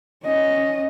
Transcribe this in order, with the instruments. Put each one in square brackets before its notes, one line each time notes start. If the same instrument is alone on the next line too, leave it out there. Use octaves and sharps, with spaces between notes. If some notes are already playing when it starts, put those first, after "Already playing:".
[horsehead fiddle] C#4 D#5